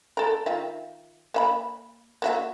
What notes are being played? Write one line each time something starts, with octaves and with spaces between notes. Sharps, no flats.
A4 A#4
D#3 F4 E5
A#3 E5 B5
A#3 F#4 E5